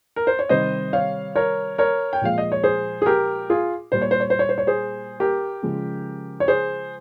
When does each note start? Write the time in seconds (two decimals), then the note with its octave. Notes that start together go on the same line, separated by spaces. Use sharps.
0.16 A#4
0.27 C5
0.39 C#5
0.49 C3 D#3 G3 C5 D#5
0.93 C#5 F5
1.35 A#4 C#5
1.78 A#4 C#5
2.13 G5
2.21 A#2 F3 G#3 F5
2.38 D#5
2.52 C#5
2.64 G#4 C5
3.02 G#4
3.06 G4 A#4
3.50 F4 G#4
3.92 A#2 G3 C5
4.02 C#5
4.11 C5
4.20 C#5
4.30 C5
4.39 C#5
4.49 C5
4.58 C#5
4.67 G#4 C5
5.20 G4 A#4
5.63 C#3 F3 G#3
6.40 C#5
6.48 G#4 C5